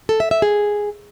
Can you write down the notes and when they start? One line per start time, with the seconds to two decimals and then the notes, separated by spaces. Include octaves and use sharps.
0.09 A4
0.20 E5
0.31 E5
0.42 G#4